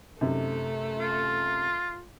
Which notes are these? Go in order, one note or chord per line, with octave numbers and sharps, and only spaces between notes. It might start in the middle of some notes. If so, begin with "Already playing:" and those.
F#2 C3 A3 D#4 A4
F4